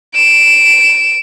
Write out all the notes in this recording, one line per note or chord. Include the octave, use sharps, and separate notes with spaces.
D7 E7